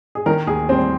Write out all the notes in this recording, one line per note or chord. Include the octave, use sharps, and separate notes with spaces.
G#4
D#3 A#4
D#2 G#4
G3 C4